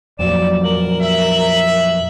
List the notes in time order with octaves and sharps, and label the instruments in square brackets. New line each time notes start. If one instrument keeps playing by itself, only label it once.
[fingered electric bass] F2 A#2 F#3 [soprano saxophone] D5 [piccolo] E7
[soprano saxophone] A#4 [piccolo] F#7
[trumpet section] E5